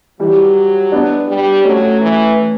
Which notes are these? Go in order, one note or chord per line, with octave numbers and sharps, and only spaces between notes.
E3 F#3 G3
B3 D4
G3
F#3 A3 C#4
E3